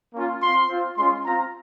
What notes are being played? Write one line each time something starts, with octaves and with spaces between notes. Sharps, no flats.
A#3 C#4 F4
C4 F4 C6
C4 F4
G#3 C#4 F4 C6
C4 F4 A#5